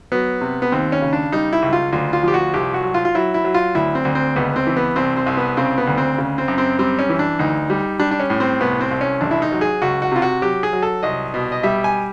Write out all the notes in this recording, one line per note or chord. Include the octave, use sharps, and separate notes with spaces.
F#3 B3
C3
B3
D#2 C4
C#4
C#3
D4
G3 D#4
E4
C#2
F4
D2 F4
F4
F3 G4
F#4
C2 G4
F#4
F#3
F4
F4
F#3 E4
E4
F#3
F4
D2 E4
C4
D2
C4
C#2 B3
C4
E3
B3
C2 C4
C4
C2
B3
C#3 C4
B3
D2
C4
C#3
C4
F#2
C4
G3 C4
C#4
E3
D4
D2 D#4
G3
G3 D4
D4
C#4
A2
C4
C2 B3
C4
C2
C#4
A1 D4
E4
D#4
F#3
G#4
C#2 F#4
F#4
C3 F4
F#4
F#3 G4
G#4
F#3
A4
C2 D#5
B2
D#5
G3 E5
G#5